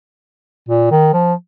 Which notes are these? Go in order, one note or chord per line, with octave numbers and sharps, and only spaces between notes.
A#2
D#3
F3